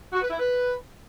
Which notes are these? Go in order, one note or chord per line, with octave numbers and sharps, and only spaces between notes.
F#4
B4
E4
B4